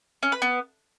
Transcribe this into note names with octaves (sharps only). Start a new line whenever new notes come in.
C#4
B4
B3